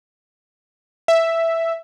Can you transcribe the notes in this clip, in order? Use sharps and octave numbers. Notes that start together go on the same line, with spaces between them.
E5